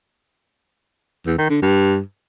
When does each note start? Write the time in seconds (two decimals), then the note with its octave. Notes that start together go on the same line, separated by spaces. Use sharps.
1.26 E2
1.38 D#3
1.50 D3
1.62 G2